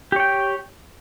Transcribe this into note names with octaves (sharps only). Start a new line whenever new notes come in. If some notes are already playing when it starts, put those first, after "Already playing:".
G4 C#5 G5